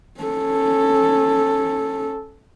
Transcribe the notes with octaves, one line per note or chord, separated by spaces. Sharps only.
C#4 A4